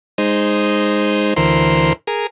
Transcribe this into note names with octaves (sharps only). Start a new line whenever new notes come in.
G#3 D#4 C5
D2 E3 A#4 C5 C6
G#4 A#4